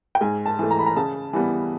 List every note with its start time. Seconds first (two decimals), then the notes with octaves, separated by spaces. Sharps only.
0.15 G5
0.21 G#2 G#5
0.46 A5
0.59 E3 A3
0.71 A#5
0.79 B5
0.86 A#5
0.96 C#3 A5
1.33 E3 G3 B3